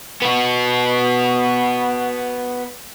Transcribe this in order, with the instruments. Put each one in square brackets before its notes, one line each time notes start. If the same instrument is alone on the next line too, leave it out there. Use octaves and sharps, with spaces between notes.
[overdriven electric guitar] B3 F#4